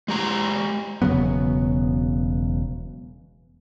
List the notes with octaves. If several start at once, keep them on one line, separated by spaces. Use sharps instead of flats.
G#3 G4 A#5
E1 C#3 F#3 B3